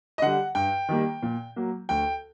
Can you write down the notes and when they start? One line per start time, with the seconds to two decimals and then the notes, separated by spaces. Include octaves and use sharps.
0.18 D#5
0.22 D3 G3 F#5
0.55 G2 G5
0.89 D#3 G3 A#3
1.23 A#2
1.56 F#3 A#3
1.89 D2 G5